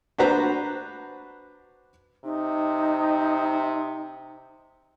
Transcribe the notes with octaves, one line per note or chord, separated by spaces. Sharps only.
D4 F#4 B4 C5 A#5
C3 D#4